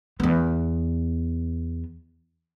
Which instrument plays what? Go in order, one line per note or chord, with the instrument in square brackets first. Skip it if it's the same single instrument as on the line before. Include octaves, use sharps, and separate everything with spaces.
[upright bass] E2 B3